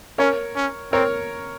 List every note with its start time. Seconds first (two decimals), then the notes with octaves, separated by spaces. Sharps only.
0.18 C#4 A#4 C#5
0.56 C#4
0.93 C4 A#4 C#5